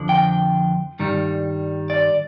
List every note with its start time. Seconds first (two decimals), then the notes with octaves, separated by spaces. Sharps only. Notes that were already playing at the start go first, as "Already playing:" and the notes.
Already playing: F2 D3 F3
0.09 G5
0.99 G2 D#3 G3
1.90 D5